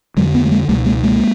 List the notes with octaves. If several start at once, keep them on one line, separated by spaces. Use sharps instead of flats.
F2 D3 F#3 G#3
A3 B3
A3
G#3 A#3
C#2 B2 G3 A3
G#3 A#3
G#3 A#3